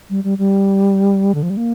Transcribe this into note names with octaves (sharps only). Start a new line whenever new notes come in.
G3
G3
G3
D3
F3
G3
A#3